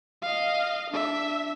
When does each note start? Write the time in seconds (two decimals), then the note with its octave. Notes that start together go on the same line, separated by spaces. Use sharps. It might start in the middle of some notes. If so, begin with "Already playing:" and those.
0.22 D#5 F5
0.90 D4 E5